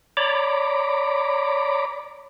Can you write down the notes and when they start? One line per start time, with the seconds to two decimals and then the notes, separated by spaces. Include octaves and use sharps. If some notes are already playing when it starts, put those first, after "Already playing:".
0.17 C#5 D5 A#5 B5 D6